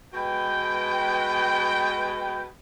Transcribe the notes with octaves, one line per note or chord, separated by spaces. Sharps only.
B2 G#3 B4 G5